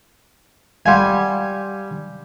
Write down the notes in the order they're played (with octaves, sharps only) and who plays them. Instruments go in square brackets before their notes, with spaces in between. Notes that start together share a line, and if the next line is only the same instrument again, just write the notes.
[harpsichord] G3 G#5 [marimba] F5 F#5 C6